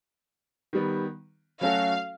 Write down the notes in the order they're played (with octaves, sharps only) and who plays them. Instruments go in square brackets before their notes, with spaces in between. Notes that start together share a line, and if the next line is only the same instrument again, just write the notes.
[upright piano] D#3 G3 B3
[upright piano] F#3 A3 C#4 F#4 A4 [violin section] F5